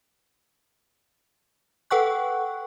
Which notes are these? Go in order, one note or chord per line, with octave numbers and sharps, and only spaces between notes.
A4 B4 F#5 G5 C#6 F#6